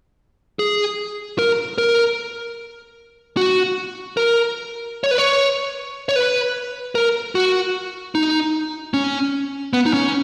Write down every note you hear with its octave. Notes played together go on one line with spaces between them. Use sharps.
G#4
A#4
A#4
F#4
A#4
C#5
B4
C#5
C#5
B4
A#4
F#4
D#4
C#4
B3
D#4
C#4